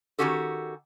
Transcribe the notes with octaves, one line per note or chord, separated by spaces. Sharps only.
D#3 E3 C#4 F#4 G4 A4